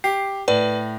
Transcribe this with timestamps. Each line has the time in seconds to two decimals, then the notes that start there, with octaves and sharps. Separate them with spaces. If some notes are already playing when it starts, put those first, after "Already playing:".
0.04 G4 C7
0.48 A2 B4 D5